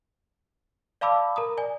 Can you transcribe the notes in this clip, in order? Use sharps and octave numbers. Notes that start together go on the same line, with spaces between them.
D5 F5 A5 B5 D6 E6
A#4 A#5 D#6
D5 G#5